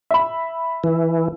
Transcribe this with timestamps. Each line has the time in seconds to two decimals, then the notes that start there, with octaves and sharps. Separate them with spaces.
0.10 E5 B5
0.84 E3